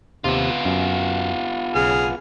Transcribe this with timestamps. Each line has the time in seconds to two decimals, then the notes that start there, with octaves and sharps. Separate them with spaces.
0.24 D#2 C3 B3 F4
0.65 F#2
1.75 B1 C#3 G#4 F6